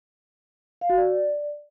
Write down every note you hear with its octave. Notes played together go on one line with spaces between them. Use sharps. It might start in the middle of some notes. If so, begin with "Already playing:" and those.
F5
F#4
D5